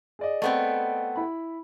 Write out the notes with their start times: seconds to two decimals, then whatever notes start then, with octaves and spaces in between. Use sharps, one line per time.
0.19 G#4 D5 D#5
0.42 A3 B3 C4
1.16 E4 B5